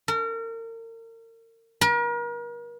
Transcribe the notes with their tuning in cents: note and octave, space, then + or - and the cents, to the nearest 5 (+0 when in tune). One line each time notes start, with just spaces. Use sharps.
A#4 -35
A#4 +40